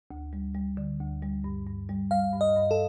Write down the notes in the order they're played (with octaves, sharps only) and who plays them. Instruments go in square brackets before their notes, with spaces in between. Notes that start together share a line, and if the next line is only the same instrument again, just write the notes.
[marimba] D2
G3
G3
D3
D2
G3
G2
G2
G3
[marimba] G3 [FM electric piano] F5
[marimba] G2
[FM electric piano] D#5
[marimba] G2
[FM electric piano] A4